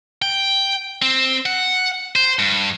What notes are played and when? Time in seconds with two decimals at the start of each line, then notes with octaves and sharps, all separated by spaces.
0.22 G5
1.02 C4
1.46 F#5
2.16 C5
2.39 G2